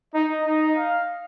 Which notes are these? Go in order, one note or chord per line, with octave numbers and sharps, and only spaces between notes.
D#4 D#5
D#4
F5